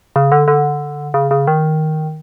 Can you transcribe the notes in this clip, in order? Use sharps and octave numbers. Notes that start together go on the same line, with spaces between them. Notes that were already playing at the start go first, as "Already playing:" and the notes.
C#3
D3
D3
C#3
C#3
D#3